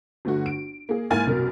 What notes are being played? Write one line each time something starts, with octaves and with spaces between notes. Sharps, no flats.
G1 A3 F#4
D7
A#3 G#4
G#2 A#3 E4 G#5 F6 A6
C2 F#2 B2 A#4